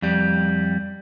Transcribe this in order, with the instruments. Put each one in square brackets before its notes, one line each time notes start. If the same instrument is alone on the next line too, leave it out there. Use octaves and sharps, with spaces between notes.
[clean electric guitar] F2 G3